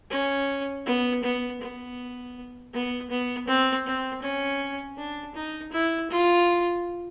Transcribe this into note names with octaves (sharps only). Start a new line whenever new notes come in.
C#4
B3
B3
B3
B3
B3
C4
C4
C#4
D4
D#4
E4
F4